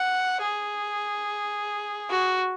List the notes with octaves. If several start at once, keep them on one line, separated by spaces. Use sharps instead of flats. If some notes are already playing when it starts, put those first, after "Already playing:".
Already playing: F#5
G#4
F#4